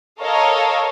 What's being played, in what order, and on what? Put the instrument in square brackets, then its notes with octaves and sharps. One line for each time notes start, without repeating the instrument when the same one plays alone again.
[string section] A4 A#4 C#5 D#5 F5